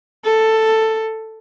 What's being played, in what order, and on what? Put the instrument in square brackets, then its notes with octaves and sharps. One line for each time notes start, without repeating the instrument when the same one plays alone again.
[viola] A4